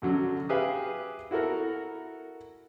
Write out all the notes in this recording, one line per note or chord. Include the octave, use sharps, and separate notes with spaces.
F#2 D3 F#3
G4 G#4 B4 E5 F5
E4 F#4 A4 A#4